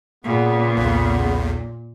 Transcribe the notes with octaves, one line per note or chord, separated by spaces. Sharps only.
A#2 C#3 B3
B1 E2